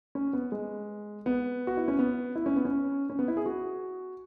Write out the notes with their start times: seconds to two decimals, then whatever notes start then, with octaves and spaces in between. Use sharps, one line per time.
0.15 C#4
0.33 B3
0.52 G#3
1.26 B3
1.67 F#4
1.77 E4
1.88 C#4
1.99 B3
2.35 E4
2.46 C#4
2.56 B3
2.65 C#4
3.10 C#4
3.19 B3
3.28 E4
3.37 G#4
3.46 F#4